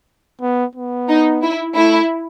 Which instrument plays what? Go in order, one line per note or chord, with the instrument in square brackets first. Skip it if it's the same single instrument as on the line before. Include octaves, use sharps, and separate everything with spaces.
[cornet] B3
B3
[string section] D#4
E4
[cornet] A3 [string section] E4